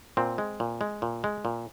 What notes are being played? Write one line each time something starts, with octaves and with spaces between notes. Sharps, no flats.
A#2 C4
G#3
A#2
G#3
A#2
G#3
A#2